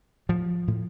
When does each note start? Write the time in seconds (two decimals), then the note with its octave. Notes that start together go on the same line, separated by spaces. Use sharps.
0.29 A2 F3
0.68 A2